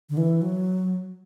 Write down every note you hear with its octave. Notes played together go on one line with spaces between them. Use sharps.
D3
E3
F#3